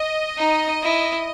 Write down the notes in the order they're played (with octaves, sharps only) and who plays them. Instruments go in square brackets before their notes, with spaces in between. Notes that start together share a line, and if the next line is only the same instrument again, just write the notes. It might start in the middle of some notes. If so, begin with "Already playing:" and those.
Already playing: [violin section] D#5
[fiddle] D#4
E4